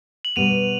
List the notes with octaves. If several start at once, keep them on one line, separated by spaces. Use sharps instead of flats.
F#7
B2 G3 B3 D#7 F7